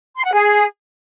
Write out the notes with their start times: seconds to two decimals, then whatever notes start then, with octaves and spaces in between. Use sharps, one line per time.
0.17 C6
0.25 F#5
0.33 G#4